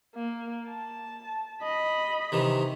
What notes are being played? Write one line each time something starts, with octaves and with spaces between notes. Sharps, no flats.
A#3
A5
D#5 B5
C3 D#3 E3